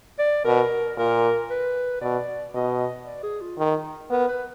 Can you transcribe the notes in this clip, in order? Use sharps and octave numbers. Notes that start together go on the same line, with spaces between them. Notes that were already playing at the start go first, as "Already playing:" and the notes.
D5
B2 A#4
A#2 A#4
B4
B2 D5
B2 D#5
D5
G#4
F4
D#3
B3 A#4
B4